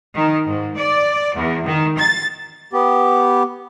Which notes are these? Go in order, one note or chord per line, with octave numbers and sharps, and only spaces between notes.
D#3
G#2
D5
E2
D#3
A6
B3 G4